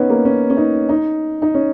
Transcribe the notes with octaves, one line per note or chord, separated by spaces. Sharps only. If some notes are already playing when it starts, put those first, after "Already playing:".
Already playing: B3 C#4 D#4
A#3
C#4
C#4
D#4
D#4
D#4
C#4